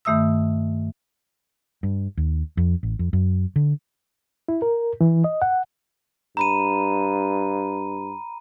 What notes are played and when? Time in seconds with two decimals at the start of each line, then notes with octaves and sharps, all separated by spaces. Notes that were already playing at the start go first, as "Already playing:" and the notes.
0.05 G2 D#3 A3 E5 D#6 E6
1.83 G2
2.17 D#2
2.57 F2
2.83 A1
2.99 F2
3.13 F#2
3.56 D3
4.48 E4
4.62 A#4
5.01 E3
5.24 D#5
5.42 F#5
6.37 G2 A#5 B5 D#7